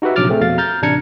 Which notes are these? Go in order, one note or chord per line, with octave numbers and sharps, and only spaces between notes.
D#4 F#4 G4 B4 E5
A#1 C3 F#3 D6 F6 A6
A3 C4 G#4
F2 B2 F5 A6
A#5 F6 G6 A6
A1 C3 D4 A#5 G#6 C#7